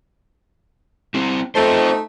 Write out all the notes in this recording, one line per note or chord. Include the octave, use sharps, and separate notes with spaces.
C4 E4
A3 C4 D#4 F4 C5